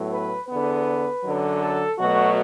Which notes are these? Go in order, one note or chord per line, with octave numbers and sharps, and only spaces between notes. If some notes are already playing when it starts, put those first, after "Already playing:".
Already playing: A2 F#3 B3
B4
E2 D3 B3 B4
F#2 D3 F#3
A4
B2 F#3 A3 F#4